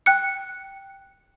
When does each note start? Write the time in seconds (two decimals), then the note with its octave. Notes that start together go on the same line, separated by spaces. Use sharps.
0.06 G5 F#6 C#7